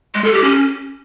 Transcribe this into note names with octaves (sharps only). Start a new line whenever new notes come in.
G#3
A4
G4
C#4